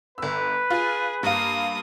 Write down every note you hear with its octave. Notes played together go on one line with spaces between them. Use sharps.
G1 B4 E6
F4 G#4
G2 A#3 F5 D#6